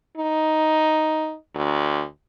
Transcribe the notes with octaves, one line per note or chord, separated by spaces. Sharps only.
D#4
D2